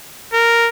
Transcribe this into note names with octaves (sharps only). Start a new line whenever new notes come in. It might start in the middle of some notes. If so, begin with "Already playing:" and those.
A#4